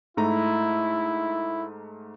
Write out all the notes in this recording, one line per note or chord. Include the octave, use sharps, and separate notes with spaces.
G#2 A3 E4 A#5